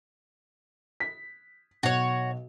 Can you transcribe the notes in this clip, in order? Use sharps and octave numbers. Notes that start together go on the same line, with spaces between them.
B6
B1 F#4 C#5